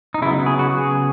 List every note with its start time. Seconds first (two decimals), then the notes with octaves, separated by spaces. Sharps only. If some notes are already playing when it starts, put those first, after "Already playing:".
0.14 D#4
0.22 C#3 F#3 B3 E4
0.46 G#4
0.59 F#4
0.70 G#4